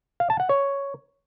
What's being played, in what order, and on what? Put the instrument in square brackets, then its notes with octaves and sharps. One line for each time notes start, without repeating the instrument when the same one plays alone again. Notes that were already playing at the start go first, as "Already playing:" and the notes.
[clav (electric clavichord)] F5
A5
F#5
C#5